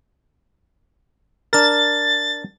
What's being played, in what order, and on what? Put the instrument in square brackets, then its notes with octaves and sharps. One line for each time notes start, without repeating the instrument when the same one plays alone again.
[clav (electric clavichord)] D4 A#4 [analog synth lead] A6